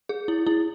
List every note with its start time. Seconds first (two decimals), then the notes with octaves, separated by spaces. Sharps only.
0.09 G#4
0.28 E4
0.47 E4